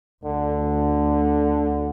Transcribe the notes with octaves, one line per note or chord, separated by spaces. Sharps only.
D2 D3